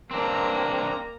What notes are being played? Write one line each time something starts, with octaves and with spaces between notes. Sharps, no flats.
A#3 C4 D4 A#5